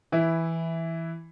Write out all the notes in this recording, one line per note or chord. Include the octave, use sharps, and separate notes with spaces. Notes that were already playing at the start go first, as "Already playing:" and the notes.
E3 E4